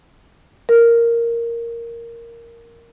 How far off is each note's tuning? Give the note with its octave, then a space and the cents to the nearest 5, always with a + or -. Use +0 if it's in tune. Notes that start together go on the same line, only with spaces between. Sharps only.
A#4 -5